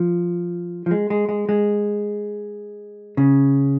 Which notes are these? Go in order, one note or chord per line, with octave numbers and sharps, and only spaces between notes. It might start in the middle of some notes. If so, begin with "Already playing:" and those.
Already playing: F3
F3
G#3
G#3
G#3
G#3
C#3